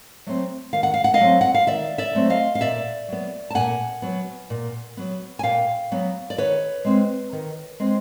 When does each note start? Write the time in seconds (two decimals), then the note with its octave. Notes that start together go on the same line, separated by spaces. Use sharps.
0.27 F#3 A3 C4
0.73 D#3 F5
0.83 F#5
0.94 F5
1.04 F#5
1.14 D#5 F5
1.20 F#3 A3 C4
1.41 F#5
1.54 F5
1.67 D#3 D5 E5
1.98 D5 E5
2.15 F#3 A3 C4
2.30 D#5 F5
2.55 F5
2.61 A#2 D5 E5
3.08 F#3 B3
3.50 A5
3.55 A#2 F#5 G#5
4.02 F#3 B3
4.50 A#2
4.97 F#3 B3
5.39 G#5
5.43 A#2 F5 G5
5.92 F#3 B3
6.30 D5
6.38 D#3 B4 C#5
6.85 G#3 C4
7.33 D#3
7.80 G#3 C4